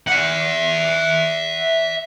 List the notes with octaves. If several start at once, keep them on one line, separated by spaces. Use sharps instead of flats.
E5 F#5